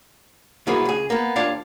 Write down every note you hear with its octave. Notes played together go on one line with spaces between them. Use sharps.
C2 F#3 A#3 B3 E4 G#4
C#2 G#4
A#3 B3
D#2 D4 F4 C#5 D5 F5